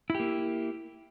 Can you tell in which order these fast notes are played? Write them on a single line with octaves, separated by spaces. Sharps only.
E4 G4 A#3